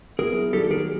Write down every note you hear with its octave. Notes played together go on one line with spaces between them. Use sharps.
F#3 B3 E4 G#4 A#4
D#3 F#3 A#3 D4 G4 A4
G#4 A#4